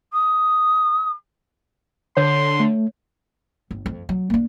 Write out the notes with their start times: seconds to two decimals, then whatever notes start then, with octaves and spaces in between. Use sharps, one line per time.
0.13 D#6
2.17 D3 C#5 C6
2.60 A3
3.71 G1
3.86 F2
4.09 F#3
4.30 A#3 D4